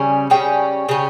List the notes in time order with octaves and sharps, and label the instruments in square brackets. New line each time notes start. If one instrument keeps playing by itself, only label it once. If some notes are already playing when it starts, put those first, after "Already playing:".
Already playing: [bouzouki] C#3 G3 C#4 [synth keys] G#5
[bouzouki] C#3 G3 C#4 [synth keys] G5
[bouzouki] C#3 G3 C#4